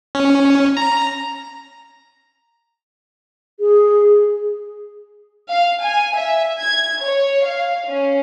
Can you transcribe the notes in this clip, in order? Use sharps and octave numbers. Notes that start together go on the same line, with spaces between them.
C#4
A#5
G#4
F5
G#5
E5
G#6
C#5
F5
C#4